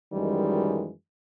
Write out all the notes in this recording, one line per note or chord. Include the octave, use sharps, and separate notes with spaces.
F#2 D#3 E3 G3 G#3